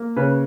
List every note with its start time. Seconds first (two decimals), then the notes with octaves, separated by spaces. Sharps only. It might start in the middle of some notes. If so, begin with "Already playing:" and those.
Already playing: A#3
0.16 C#3 B4